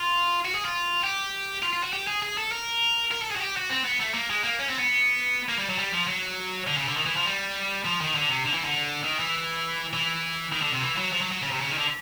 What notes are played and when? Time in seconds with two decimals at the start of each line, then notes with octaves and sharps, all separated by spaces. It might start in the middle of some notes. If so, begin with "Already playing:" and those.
Already playing: F4
0.45 F#4
0.55 G#4
0.65 F4
1.04 G4
1.62 F4
1.73 F4
1.83 F#4
1.93 G4
2.07 G#4
2.23 G#4
2.38 A4
2.52 A#4
3.11 A#4
3.21 A4
3.31 G#4
3.36 F#4
3.41 G4
3.56 F#4
3.70 C4
3.85 B3
4.00 A3
4.14 A#3
4.30 G#3
4.44 A#3
4.59 C#4
4.70 C4
4.79 B3
5.49 A#3
5.59 G3
5.68 F#3
5.78 G3
5.93 F3
6.08 F#3
6.67 D3
6.76 C#3
6.87 D3
6.97 D#3
7.06 E3
7.17 F3
7.26 G3
7.85 F3
8.01 D#3
8.15 D3
8.29 C3
8.45 D3
8.54 E3
8.65 D3
9.04 D#3
9.19 E3
9.93 E3
10.52 D#3
10.62 D3
10.73 C3
10.82 E3
10.97 F#3
11.12 F3
11.21 F#3
11.32 F#3
11.42 C#3
11.52 C3
11.61 C#3
11.71 D#3
11.78 D3